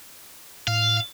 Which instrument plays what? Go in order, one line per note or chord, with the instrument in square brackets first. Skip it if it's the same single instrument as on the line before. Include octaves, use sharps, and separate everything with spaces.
[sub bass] A2 [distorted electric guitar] F5